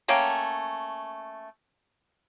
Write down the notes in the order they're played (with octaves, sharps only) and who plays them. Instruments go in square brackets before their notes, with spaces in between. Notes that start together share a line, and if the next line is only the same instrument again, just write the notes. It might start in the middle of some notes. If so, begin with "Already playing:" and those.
[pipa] A3 A#3 C#4 G5